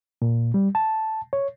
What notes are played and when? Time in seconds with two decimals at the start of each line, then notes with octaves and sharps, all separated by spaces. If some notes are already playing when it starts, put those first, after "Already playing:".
0.22 A#2
0.54 G3
0.75 A5
1.33 C#5